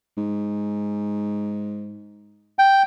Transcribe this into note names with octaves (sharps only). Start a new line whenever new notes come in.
G#2
G5